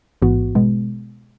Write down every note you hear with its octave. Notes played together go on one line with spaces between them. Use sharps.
A1 G#2 E3 B3 F#4
B2 G#3 B3